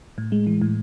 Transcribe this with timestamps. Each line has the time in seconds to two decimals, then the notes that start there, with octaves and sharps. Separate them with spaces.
0.18 A2
0.32 G#3
0.47 E3
0.62 A2